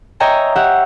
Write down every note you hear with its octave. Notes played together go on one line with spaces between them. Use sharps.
C#5 D#5 E5 G5 G#5 A#5
G4 E5 F#5